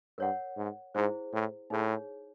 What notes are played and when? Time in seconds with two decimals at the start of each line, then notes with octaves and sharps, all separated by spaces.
0.18 G2 A#4 C#5 F#5
0.56 G#2
0.95 G#2 E4 G#4 C5
1.33 A2
1.70 A2 D#4 G#4 C#5